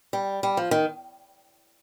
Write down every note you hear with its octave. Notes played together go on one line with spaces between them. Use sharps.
G3
G3
F3
D#3